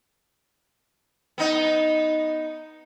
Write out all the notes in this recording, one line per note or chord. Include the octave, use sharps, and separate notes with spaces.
B3 D#4